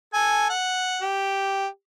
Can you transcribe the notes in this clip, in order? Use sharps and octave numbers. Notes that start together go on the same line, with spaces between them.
A4 G#5
F#5
G4